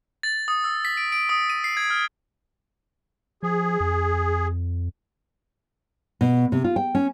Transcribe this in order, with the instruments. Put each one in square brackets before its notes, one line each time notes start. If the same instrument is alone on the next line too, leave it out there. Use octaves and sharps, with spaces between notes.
[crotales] A6
D#6
E6
B6
D7
D7
D#6
D#7
C7
G#6
F6
[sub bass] F3 [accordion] G#4
[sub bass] F2
[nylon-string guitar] B2
C3
F4
G5
C#4